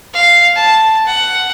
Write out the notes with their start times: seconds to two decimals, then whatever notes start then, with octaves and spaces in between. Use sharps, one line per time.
0.14 F5
0.56 A5
1.07 F#5